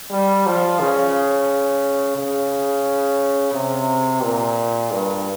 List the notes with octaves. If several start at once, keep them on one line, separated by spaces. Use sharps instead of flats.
G3
F3
C#3
C#3
C3
A#2
G2